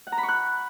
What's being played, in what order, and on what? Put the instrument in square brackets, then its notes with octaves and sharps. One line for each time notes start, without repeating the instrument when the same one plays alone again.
[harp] F#5
A#5
B5
C#6
F#6